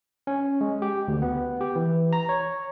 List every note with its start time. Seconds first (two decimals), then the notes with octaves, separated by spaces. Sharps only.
0.27 C#4
0.61 G#3
0.82 G4
1.08 D2
1.22 B3
1.61 G4
1.76 E3
2.13 A#5
2.29 C#5